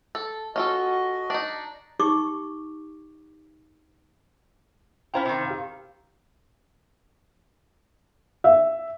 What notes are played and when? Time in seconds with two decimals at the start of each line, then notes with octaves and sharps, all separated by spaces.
0.15 A4
0.56 C#4 F4 F#4 A4 D#5
1.30 D4 D#4
1.99 D#4 G4 C#6 D6
5.14 C#4 E4 C5 F5 G5 A#5
5.25 C3 D#3
5.48 G4 F5
8.44 E5